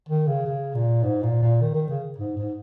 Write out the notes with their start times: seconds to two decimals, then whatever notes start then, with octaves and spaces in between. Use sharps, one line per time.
0.09 D#3
0.27 C#3
0.46 C#3
0.74 A#2
1.03 G#2
1.23 A#2
1.42 A#2
1.61 D#3
1.74 D#3
1.89 C#3
2.18 G#2
2.37 G#2